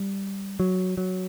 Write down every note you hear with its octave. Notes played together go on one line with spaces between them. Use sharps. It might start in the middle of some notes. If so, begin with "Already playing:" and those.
Already playing: G3
F#3
F#3